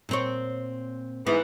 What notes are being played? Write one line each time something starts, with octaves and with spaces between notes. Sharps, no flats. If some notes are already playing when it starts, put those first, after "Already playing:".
A#2 C4 C#5
G#2 E3 B3